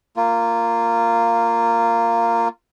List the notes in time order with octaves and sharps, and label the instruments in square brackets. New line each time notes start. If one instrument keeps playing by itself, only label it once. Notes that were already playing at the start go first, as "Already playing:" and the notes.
[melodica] A#3 F4